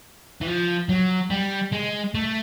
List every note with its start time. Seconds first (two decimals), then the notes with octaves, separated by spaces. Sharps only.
0.42 E3
0.47 F3
0.89 F#3
1.31 G3
1.73 G#3
2.15 A3